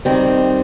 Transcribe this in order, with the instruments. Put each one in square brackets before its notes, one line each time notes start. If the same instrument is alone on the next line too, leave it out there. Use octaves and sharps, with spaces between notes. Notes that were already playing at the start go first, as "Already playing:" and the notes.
[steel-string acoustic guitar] D#3 G3 C4